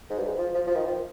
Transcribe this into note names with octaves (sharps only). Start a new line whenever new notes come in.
G#2
G2
G#2
F3
F3
F3
D#3
F3